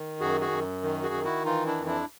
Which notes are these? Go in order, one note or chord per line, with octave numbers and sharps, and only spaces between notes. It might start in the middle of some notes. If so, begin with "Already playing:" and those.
Already playing: D#3
F#2 F#4 G#4
F#4 G#4
F#2
D#3
F#4 G#4
D#3
E4 F#4
E3 D#4 F4
D4 E4
F2
D4 E4